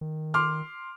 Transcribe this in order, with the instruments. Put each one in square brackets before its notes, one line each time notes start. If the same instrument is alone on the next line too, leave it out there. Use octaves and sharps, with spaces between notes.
[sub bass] D#3
[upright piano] C6 D6 F6